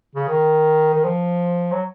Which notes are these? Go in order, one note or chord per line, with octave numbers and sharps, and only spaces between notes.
C#3
D#3
D#3
F3
F#3